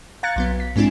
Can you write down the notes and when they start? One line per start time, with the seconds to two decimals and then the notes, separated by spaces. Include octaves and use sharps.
0.23 F5 A#5 F#6 G#6 A6 C#7
0.36 B1 F#3 B3
0.60 B6
0.76 G#2 G#3 C4 D4 E4